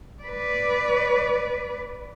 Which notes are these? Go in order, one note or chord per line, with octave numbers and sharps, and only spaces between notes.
B4 D5